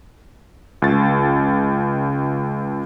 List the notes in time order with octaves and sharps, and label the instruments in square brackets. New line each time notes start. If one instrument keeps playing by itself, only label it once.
[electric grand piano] C#2 A6